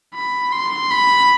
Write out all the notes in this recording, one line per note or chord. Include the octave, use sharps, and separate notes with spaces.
B5
C6
B5